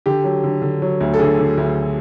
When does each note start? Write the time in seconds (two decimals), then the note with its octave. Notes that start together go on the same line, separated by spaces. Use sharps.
0.06 D3 G4
0.24 F#3
0.44 D3
0.62 D3
0.82 F#3
1.00 D2
1.13 A4
1.19 D3 G#4
1.39 D3
1.57 D2